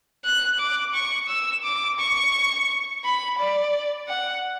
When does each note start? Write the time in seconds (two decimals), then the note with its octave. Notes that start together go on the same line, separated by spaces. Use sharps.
0.25 F#6
0.60 D6
0.94 C#6
1.29 E6
1.64 D6
1.99 C#6
3.05 B5
3.39 D5
4.09 F#5